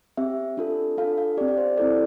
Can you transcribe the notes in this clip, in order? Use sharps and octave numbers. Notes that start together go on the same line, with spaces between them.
C4 G4 E5
D4 F4 A4
D4 F4 A4 F5
F5
C4 G4 D5
D5
C5
C4 E4 A4 D5